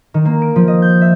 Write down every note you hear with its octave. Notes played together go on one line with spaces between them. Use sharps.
D#3
A#3
D7
F3
D#5
G6
E5